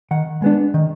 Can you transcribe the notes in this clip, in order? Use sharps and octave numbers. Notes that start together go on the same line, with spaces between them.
D#3 F#5
G#3 B3 D4
D#3